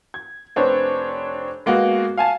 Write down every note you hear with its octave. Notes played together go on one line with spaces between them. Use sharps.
G#6
F1 C4 D4 B4 C#5
G#3 A#3 B3 F#4
F5 G#5 A5